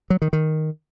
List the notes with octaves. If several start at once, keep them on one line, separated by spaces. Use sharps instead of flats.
F#3
D#3
D#3